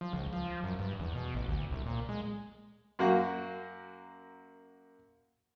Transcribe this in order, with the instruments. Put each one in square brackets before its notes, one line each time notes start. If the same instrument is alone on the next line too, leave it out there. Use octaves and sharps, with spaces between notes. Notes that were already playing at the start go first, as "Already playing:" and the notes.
[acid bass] F3
C#2
F3
F#2
G2
E2
B2
A1
D2
C2
A#2
G#3
[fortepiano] F#2 A#3 F#4 F#5